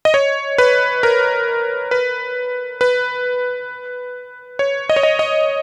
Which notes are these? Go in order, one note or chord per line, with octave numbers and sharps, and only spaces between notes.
D#5
C#5
B4
A#4
B4
B4
C#5
D#5
C#5
D#5
D#5